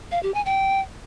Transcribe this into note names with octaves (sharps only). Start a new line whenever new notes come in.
F5
G4
G#5
G5